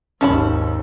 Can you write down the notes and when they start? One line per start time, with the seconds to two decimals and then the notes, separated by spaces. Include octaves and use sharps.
0.21 G#1 D#2 C#4 A5 B5